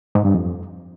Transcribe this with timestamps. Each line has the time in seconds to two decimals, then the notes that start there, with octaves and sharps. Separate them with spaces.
0.15 G#2
0.25 G2
0.34 F2